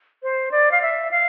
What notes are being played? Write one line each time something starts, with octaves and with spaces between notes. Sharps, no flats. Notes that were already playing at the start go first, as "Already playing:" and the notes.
C5
D5
F5
E5
F5